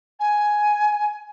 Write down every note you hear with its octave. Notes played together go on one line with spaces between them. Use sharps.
G#5